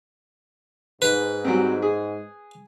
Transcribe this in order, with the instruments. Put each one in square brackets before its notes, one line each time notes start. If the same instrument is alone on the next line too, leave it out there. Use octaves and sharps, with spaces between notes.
[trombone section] G#2 [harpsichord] B4
[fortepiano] F#3 G3 C4
G#4